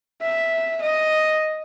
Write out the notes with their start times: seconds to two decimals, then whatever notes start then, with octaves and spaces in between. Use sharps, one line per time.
0.22 E5
0.82 D#5